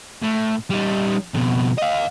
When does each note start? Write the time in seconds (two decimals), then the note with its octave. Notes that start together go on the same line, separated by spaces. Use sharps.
0.22 A2
0.70 G3 D#4
1.34 F2 B2
1.78 D#5 F5